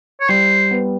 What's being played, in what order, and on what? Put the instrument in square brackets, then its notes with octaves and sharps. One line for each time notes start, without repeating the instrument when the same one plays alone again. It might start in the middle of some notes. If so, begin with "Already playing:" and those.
[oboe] C#5
[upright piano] G3 [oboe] C5
[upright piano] B3